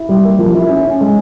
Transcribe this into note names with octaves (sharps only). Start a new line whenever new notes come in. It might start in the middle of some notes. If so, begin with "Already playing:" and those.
Already playing: E4
G3
A#3
F3
E4
C#4
C#4
G#3